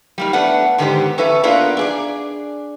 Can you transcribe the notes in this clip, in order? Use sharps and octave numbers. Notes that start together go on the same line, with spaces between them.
G3 A#3 D#4
A3 B3 D4 B4 F#5
G#2 D3 D#3 B3 G4 C5
C#4 A4 B4 E5
A#3 B3 D4 F4 A#4 B4
D4 G#4 D5